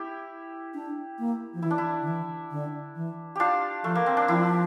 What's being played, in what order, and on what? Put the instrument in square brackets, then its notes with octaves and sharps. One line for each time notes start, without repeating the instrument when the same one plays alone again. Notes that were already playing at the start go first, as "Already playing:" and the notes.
Already playing: [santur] E4 G4
[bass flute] D4
A#3
F3
[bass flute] E3 [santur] E4
[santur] D4
E4
[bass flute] D3
E3
D3
E3
[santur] D4 F4 G4
[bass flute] F3 [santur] A3
[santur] A#3
C4
D4
[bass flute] F3 [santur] E4